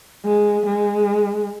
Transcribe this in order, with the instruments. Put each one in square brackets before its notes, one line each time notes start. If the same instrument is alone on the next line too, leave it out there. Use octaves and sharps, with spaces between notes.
[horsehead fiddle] G#3
G#3